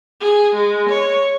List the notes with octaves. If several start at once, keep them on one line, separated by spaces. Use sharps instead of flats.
G#4
G#3
C#5